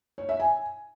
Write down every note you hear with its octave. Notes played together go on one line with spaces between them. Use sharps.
C#5
E5
G#5